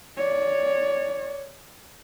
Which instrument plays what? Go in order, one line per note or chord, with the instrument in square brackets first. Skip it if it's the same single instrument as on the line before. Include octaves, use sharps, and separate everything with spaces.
[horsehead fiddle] C#5 D5